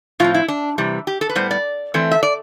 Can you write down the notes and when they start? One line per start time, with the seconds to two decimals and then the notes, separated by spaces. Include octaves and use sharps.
0.20 A2 F3 C4 F4
0.34 E4
0.48 D4
0.78 C3 E3 G3
1.07 G4
1.21 A4
1.29 B4
1.35 A2 G3 B3 C5
1.51 D5
1.94 E3 A3 C4
2.11 E5
2.23 D5